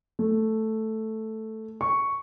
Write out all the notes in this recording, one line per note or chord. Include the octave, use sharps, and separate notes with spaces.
A3
C#6